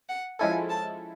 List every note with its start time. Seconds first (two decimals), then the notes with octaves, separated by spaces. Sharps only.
0.09 F#5
0.39 F3 G#3 C#4 E4 A4 G#5
0.70 A5